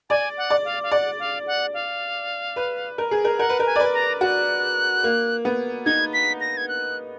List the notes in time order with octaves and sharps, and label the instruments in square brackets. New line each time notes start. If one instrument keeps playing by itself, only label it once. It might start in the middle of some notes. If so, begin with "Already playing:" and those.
[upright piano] D5 [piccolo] G#5
[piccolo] F#5
[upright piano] D5
[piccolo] F5
F5
[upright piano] D5 [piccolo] F#5
[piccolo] F5
F#5
F5
[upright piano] B4
A#4
G#4
A#4
[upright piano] A#4 [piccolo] F#5
[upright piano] B4
A#4
[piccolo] G#5
[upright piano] D5
B4
[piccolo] A#5
[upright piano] F#4 [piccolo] F#6
[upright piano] A#3
B3
[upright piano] D#4 [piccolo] G#6
[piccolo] B6
A#6
G#6
F#6